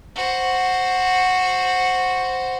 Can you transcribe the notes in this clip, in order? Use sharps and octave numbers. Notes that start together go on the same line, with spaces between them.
F#4 C5